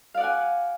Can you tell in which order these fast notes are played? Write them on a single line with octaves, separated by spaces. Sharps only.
F5 D5 F#5 G#5